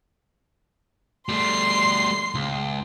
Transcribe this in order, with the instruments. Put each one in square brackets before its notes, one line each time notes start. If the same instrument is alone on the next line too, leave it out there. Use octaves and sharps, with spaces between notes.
[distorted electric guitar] G3 A3 [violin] C6 C7
[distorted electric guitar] C#2